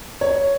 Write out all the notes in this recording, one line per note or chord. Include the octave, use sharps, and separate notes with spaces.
C#5